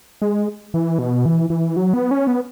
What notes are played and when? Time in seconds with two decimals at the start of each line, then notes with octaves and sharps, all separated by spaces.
0.22 G#3
0.74 E3
0.99 B2
1.25 E3
1.50 E3
1.76 F#3
1.94 B3
2.11 C#4
2.27 B3